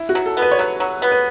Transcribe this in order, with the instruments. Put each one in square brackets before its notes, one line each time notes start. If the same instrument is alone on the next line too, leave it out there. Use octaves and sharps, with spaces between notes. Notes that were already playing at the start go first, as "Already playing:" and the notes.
Already playing: [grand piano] E4
F#4
[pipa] F#3
[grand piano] A4
[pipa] B3
[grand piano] B4
C#5
[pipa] F#3 [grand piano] B4
[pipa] F#3
B3
[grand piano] B4